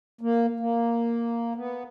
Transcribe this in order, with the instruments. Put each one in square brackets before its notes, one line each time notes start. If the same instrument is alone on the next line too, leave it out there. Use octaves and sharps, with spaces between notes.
[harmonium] A#3
A#3
B3